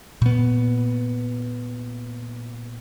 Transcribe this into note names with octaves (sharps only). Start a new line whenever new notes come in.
A#2 B3